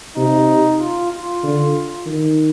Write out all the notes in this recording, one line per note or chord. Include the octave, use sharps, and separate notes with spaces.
C3 D#4
F4
F4
D3
D#3